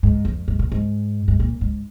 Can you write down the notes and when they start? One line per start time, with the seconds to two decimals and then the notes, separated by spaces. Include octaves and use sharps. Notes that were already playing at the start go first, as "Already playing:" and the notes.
0.03 G#2
0.25 F2
0.48 G#2
0.59 A#2
0.72 G#2
1.28 G#2
1.40 A#2
1.61 G#2